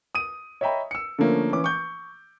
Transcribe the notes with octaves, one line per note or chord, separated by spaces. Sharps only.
D#6 D#7
C#5 D#5 E5 G5 A#5 B5
E6 C#7
D3 F3 A3 A#3 C#4
E3 C#4 D6
C#6 G6